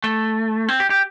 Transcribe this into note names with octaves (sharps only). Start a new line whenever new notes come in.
A3
C4
G4
G4